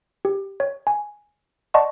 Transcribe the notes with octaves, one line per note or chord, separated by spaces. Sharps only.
G4
C#5
G#5
D5 D#5 F#5 A5 C6 C#6